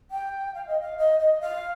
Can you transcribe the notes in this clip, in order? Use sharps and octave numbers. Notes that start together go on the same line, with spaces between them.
G5
F5
D#5
F5
D#5
D#5
F5